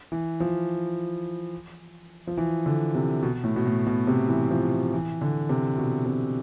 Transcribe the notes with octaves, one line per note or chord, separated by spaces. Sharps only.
E3
F3
F3
E3
D3
C3
B2
A2
B2
A2
B2
C3
E3
F3
E3
D3
C3
B2
C3